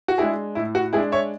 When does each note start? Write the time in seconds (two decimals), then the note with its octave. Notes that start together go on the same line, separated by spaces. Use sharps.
0.08 F#4
0.18 G#3 D4 E4 G#4
0.55 A2 E4
0.75 F#4
0.93 G#3 E4 G#4
0.97 D4
1.12 C#5 E5